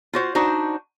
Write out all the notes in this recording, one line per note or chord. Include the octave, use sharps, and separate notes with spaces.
F4 F#4 C5
D4 D#4 F#4 C5